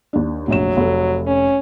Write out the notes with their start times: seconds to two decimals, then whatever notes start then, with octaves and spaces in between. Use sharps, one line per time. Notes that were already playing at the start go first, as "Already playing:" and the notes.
0.13 D#2 D4
0.48 F1 A#1 F#3 E7
0.77 F1 A4
1.27 C#4